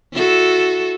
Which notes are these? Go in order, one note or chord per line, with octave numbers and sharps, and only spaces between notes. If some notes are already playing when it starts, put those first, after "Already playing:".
E4 F#4 A4